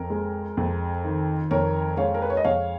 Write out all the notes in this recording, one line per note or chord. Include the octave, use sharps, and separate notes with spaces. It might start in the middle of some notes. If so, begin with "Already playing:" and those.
Already playing: F2 A#4
G#3
F2
D#3
F2 A#4 C#5
G#3 C#5 F5
A#4
B4
C#5
D#5
F2 C#5 F5